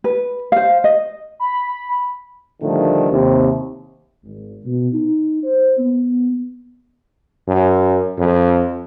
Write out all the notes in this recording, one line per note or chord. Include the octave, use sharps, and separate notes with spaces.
B4
C5 F5
D#5
B5
A2 D3 D#3 F3 G3 A3
D#2 C3
G#1
B2
D#4
C5
B3
F#2
F2